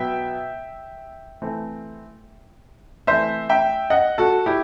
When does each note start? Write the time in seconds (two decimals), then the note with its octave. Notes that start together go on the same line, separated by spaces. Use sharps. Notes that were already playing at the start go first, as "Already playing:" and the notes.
Already playing: B2 F#3 B3 E5 G5
1.42 E3 A3 C4
3.07 E3 A3 C4 C5 E5
3.49 E5 G5
3.90 D#5 F#5
4.18 F#4 A4
4.46 E4 G4